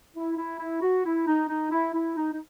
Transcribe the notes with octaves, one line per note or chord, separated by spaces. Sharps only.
E4
E4
E4
F#4
E4
D#4
D#4
E4
E4
D#4
D#4